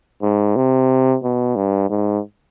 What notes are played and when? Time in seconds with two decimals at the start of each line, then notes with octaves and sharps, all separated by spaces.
0.22 G#2
0.56 C3
1.24 B2
1.56 G2
1.90 G#2